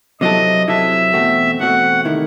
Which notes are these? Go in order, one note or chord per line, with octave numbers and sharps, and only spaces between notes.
C3 F#3 C4 E4 A4 D#5
C3 F#3 C4 E4 A4 E5
E2 B2 A3 C4 F#4
E2 B2 A3 C4 F#4 F#5
C3 D#3 A3 E4